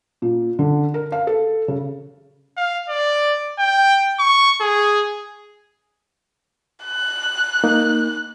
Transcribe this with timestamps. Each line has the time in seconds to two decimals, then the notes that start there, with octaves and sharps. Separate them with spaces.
0.22 A#2
0.59 D3
0.94 A#4
1.12 F5
1.27 A4
1.68 C#3
2.57 F5
2.89 D5
3.59 G5
4.20 C#6
4.61 G#4
6.84 F#6
7.64 A#3 D#4